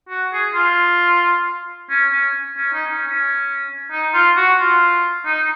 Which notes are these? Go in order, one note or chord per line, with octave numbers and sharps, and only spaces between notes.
F#4
G#4
F4
C#4
C#4
C#4
D#4
C#4
C#4
D#4
F4
F#4
F4
D#4